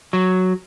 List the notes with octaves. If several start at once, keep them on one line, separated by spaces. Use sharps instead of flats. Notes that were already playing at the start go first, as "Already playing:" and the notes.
F#3